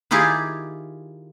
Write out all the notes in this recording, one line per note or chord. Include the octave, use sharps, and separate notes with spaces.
D#3 E4 F4 G4 G#4